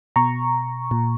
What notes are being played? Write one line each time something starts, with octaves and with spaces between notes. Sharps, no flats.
B2 A#5 C#6
A#2